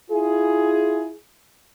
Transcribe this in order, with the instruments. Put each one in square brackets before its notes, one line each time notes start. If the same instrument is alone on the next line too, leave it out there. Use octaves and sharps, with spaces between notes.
[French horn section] E4 F4 G#4